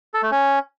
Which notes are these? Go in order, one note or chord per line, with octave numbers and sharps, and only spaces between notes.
A4
A3
C#4